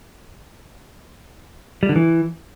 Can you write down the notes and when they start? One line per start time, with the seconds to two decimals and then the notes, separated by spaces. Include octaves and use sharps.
1.83 G3
1.89 D3
1.96 E3